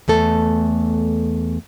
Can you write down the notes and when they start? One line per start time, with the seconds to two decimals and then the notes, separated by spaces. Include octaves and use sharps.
0.08 E2 A3 A4